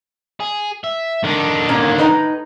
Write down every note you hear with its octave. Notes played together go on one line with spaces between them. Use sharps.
G#4
E5
D3 D#3 D4
A#2 A#3 C#4
A2 D#4 B4